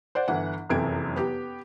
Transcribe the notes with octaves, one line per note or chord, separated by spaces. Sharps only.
C5 D5 F#5
G1 E3 F#5
F#1 F2 C3 E3 G#6 D7
B3 G4